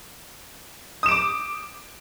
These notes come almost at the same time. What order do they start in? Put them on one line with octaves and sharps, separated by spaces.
D#6 E7 D7 D6